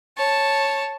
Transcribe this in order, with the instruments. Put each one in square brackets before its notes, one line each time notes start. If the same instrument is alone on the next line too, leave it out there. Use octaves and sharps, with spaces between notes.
[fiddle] C#5 A5